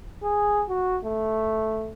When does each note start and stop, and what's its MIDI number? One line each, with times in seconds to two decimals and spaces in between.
0.23 0.63 68
0.69 0.97 66
1.04 1.92 57